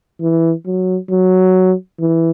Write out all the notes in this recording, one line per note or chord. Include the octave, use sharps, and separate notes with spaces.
E3
F#3
F#3
E3